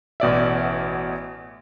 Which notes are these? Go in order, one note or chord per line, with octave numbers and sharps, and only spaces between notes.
A1 B2 D5 E5